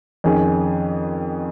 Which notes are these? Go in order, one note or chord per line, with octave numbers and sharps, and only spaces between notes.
F2 D#3 C#4 G#4